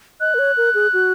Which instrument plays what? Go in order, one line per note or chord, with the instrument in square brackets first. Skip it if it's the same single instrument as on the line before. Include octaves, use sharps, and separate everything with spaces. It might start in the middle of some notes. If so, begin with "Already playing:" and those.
[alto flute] D#5 [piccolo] F#6
[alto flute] A#4
C#5
A#4
G#4
F#4